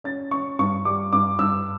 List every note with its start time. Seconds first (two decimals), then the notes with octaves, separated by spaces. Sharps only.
0.04 C#4 A6
0.31 C#4 C#6
0.59 G2 C#6
0.85 G3 D6
1.13 G2 D6
1.39 G2 E6